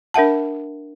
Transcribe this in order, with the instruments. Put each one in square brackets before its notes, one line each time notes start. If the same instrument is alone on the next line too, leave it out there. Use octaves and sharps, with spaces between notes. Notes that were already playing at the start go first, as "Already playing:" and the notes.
[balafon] D4 A#4 E5 F#5 A5